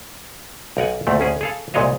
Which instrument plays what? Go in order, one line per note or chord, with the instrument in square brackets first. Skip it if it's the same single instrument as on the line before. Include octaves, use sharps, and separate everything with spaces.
[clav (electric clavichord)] B1 A#4 F#5 G#5
D2 A#2 A3
D2 C#4 G#4
G#4 A4 F5
C2 A#2 G#3 C#5 D#5 F5